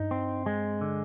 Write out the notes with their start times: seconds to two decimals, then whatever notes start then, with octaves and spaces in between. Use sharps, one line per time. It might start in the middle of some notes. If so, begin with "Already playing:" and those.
Already playing: G2 D#4
0.11 C4
0.46 G#3
0.81 D3